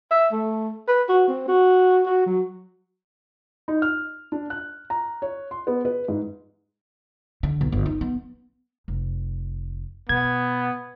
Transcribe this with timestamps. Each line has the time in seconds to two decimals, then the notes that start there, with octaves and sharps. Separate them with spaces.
0.11 E5
0.32 A3
0.88 B4
1.09 F#4
1.28 C4
1.48 F#4
2.06 F#4
2.26 F#3
3.68 D#4
3.82 F6
4.32 D4
4.50 F#6
4.90 A#5
5.22 C#5
5.51 C6
5.67 B3
5.85 B4
6.08 G#2
7.43 D3
7.61 B1
7.72 G1
7.86 D#4
8.01 B3
8.88 F1
10.09 B2 B3 G#6